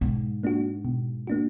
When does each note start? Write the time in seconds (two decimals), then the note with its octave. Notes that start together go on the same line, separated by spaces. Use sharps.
0.01 G#2 B2
0.43 A#3 D4 F#4
0.85 B2
1.27 A#3 D4 F#4